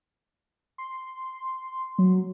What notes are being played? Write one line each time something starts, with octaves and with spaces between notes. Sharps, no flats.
C6
F#3